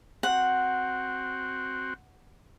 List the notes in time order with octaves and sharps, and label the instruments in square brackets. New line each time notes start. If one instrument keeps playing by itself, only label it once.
[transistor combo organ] C4 F#4 [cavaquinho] F#5